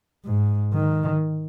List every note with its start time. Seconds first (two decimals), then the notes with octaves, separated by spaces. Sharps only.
0.25 G#2
0.74 D#3